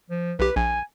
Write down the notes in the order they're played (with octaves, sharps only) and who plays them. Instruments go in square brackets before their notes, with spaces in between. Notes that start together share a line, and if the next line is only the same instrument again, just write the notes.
[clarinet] F3
[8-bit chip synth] B1 G4 [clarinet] B4
[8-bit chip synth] A#1 [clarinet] G#5